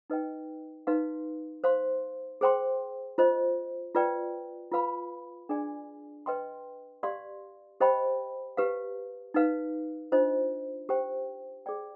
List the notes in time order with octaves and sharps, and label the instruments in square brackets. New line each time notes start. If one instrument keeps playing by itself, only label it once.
[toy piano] D#4 B4 D#5 G5
D#4 B4 F5 C6
C5 F5 C6
G#4 C5 G5 C6
F4 C5 D#5
F4 B4 D5 G5
F4 B4 F5 B5
D4 G#4 D5 G#5
B4 D#5 G5 C6
G4 D5 F5 C6
G4 C5 D#5 G5 B5
G4 B4 F5
D#4 B4 F5
D4 F4 C5 D#5
G4 C5 G5
G#4 D5 G5